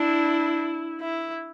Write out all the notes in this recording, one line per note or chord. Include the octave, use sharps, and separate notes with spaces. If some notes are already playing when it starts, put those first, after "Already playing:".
Already playing: D4 E4
E4